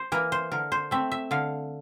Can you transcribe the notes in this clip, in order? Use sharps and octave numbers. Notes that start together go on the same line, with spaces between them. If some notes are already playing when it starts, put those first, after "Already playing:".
Already playing: C5
E3 A#3 A#4
C5
D3 A#4
C5
A3 C4 E5
E5
D3 F5